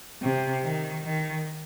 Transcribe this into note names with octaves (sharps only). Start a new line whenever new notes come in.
C3
D#3
D#3